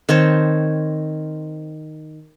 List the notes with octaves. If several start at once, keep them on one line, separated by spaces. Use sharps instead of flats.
D#3 C4 C#5 A5